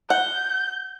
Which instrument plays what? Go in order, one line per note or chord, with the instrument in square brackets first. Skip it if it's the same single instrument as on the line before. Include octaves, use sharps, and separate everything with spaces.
[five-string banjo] F#5 [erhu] G6